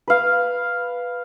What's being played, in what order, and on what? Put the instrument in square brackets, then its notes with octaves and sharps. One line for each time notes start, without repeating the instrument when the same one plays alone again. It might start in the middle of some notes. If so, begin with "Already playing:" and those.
[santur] B4 F5